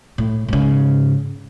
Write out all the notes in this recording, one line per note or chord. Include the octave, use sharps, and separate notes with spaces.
A2
G#2 C#3